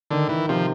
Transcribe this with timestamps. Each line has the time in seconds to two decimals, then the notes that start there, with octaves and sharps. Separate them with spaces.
0.11 D3 D#3
0.29 D#3 E3
0.49 C3 F3